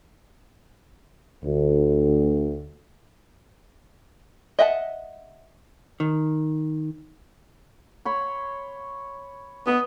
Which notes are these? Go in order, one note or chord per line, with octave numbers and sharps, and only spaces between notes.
D2
D#5 E5 F#5 G5 A5
D#3
C#5 B5 C6
B3 D#5 B5